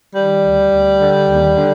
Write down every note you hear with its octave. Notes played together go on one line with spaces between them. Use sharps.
D#3 G3
D2
D2
D3
D#2
D3